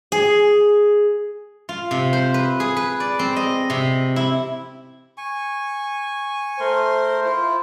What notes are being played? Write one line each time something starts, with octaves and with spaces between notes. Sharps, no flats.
G#4
F4
C3
C5
B4
G#4
B4
D5
C4
D#5
C3
E4
G#5 C#6
A3 A#4 C5 C6
E4 F4